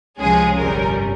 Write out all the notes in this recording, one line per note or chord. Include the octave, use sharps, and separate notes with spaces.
C#2 C3 F3 G#3 C#4 G#4
G1 F2 C3 G3 C#4 A#4